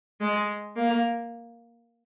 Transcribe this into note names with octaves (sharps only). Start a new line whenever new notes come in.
G#3
A#3